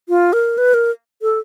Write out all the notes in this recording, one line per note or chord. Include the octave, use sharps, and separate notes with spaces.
F4
A#4
B4
A#4
A4